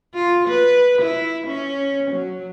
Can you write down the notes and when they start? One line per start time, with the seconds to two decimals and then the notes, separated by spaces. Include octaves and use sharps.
0.15 F4
0.48 B4
1.02 E4
1.47 C#4
2.11 F#3